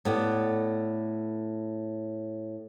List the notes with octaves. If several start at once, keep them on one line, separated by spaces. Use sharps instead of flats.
A2 B3 D5